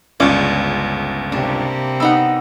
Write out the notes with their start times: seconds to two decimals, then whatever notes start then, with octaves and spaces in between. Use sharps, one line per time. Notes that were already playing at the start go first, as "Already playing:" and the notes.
0.20 G1 C#2 C#4 F4 D5
1.32 C3 G3 A#3 D4
2.00 B3 D#4 F#5 E6